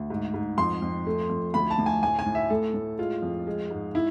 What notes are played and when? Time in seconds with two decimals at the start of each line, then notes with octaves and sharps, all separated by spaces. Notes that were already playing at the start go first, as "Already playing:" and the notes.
Already playing: D2
0.10 G#2
0.34 G#2
0.58 F2 C6
0.82 F2
1.07 A3
1.30 F2
1.54 D2 B5
1.70 A5
1.78 D2
1.86 G#5
2.02 A2 G#5
2.19 G#5
2.26 A2
2.35 E5
2.50 A2 A4
2.74 A2
2.99 G#3 F4
3.23 F2
3.47 G#3
3.71 G#2
3.95 E4